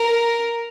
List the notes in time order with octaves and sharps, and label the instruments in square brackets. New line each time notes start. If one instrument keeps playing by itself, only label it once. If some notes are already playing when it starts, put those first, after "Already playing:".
Already playing: [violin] A#4